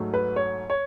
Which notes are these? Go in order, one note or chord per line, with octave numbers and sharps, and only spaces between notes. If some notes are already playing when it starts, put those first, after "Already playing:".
Already playing: G#2 F#3 A3
B4
C#5
C#5